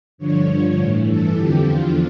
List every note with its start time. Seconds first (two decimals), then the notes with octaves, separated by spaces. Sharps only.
0.18 G2 D3 F3 C#5
0.47 G2 D3 F3
0.77 A2 E3
1.06 G2 E3 A4
1.35 F2 D3 F3 G4
1.65 E2 D3 F3 F4